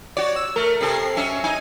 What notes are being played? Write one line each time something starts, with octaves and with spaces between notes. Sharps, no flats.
F#4 C#5 D5
E6
A3 A#4
C3 A4 A#4 C7
F#3 C#4 E5
D#4 G#5